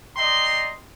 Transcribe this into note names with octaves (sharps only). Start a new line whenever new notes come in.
D5 D#5 G5 A#5 C6